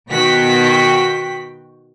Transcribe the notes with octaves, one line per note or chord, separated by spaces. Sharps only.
B2 D#3 F#4 G5 B6